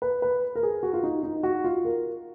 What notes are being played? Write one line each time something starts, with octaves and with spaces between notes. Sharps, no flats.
B4
B4
A#4
G#4
F#4
F4
D#4
D#4
F#4
F4
A#4